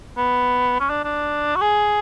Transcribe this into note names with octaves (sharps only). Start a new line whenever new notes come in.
B3
C#4
D4
D4
F#4
G#4